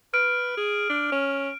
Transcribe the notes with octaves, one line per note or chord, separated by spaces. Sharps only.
B4 F6 D7
G#4
D4
C#4